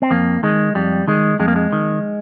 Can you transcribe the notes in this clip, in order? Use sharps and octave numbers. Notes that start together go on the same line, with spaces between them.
C4
F2 A#3
D#3 G#3
F2 G3
D#3 G#3
F2 G#3
A#3
G#3
D#3